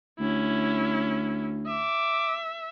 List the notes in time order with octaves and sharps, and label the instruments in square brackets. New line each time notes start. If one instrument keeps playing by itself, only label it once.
[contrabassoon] D2 [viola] C#4 E4
[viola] E5 [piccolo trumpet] D6